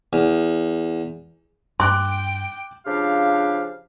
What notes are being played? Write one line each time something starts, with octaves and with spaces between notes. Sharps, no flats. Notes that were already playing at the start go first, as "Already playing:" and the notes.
E2
G2 G5 C6 D6 F#6
C#3 F3 D4 G4 F5